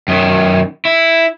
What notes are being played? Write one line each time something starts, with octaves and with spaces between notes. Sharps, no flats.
F#2 D#3
E4